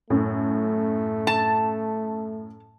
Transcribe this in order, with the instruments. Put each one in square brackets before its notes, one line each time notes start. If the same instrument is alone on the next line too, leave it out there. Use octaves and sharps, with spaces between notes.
[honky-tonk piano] F#2 A2 [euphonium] A3
[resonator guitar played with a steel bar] A5